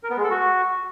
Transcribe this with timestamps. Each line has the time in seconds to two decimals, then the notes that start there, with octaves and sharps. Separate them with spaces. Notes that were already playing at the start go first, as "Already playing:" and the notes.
0.04 A#4
0.10 B3
0.17 G#3
0.24 A4
0.30 F#4